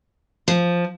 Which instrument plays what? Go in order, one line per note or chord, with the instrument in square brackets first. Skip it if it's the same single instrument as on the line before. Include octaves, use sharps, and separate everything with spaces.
[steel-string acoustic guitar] F3